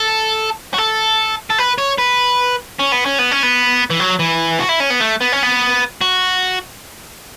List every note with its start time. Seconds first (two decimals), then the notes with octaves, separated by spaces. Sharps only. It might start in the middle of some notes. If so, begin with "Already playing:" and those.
Already playing: A4
0.74 F#4
0.78 A4
1.50 A4
1.58 B4
1.78 C#5
1.98 B4
2.79 C#4
2.92 B3
3.06 C#4
3.19 B3
3.31 C#4
3.43 B3
3.90 E3
4.00 F#3
4.19 E3
4.60 F#4
4.69 E4
4.80 C#4
4.90 B3
5.00 A3
5.21 B3
5.32 C#4
5.43 B3
6.01 F#4